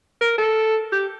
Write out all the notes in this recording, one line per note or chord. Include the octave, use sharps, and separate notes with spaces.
A#4
A4
G4